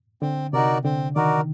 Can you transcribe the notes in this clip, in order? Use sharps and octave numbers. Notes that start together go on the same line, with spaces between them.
D3 C4
C3 D#4 F#4 A#4 D5
D3 C4
D#3 D#4 F#4 A#4 D5